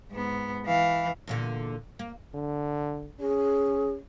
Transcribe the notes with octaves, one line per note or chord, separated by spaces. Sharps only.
G#2 B3
E3 F5
E2 A#2 D3
A#3
D3
C#4 G#4